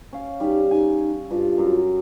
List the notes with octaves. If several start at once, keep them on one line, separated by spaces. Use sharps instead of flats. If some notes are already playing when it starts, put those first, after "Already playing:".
C#4 F5
G3 D#4
D#4 G#5
G2 F4
F#2